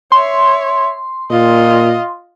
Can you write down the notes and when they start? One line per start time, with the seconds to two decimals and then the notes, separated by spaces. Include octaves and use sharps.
0.12 C#5 E5 C6
1.30 A#2 F4 D#5